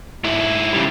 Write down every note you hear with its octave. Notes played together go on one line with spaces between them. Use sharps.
G#2 E4
C#3 G3